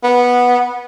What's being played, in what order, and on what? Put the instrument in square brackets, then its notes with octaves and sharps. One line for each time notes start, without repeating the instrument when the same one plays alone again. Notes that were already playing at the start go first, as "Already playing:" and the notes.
[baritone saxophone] B3